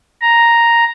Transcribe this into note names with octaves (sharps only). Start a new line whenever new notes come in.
A#5